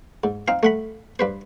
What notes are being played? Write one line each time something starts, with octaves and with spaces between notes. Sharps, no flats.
G#2
C4 D#4 F5
A3 F#5 B5
G2 B4 C5